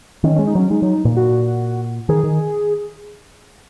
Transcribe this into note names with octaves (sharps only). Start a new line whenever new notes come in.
D#3 C#4
C#4
G#3
D#4
F#3 C#4
G#3 D#4
F#3
A#2
F#4
D#3 G#4
D#3